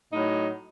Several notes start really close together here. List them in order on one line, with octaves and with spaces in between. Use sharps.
D#4 A2 F#3